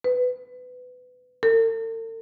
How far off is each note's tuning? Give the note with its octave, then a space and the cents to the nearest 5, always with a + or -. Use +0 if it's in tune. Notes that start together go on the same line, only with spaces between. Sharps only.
B4 +20
A4 +45